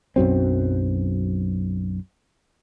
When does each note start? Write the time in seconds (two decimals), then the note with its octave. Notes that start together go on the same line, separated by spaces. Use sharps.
0.16 B1 F#2 F#3 C4